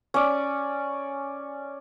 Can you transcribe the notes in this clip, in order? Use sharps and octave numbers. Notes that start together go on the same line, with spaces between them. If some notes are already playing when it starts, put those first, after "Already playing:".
C#4 D5